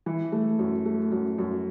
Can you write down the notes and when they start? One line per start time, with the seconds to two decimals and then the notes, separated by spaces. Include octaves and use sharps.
0.06 E3
0.32 A3
0.59 F#2
0.85 A3
1.12 F#2
1.38 F#2